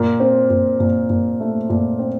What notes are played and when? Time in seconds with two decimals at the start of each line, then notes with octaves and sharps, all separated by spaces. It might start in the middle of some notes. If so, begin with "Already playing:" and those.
Already playing: A#2 A#4
0.20 C4
0.50 A#2
0.80 A#2
1.10 A#2
1.40 A3
1.70 A#2
1.99 C4